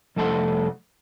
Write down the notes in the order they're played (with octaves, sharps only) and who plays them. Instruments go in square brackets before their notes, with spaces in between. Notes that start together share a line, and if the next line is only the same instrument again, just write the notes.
[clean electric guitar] C2 F2 A3 A4 F#5 C6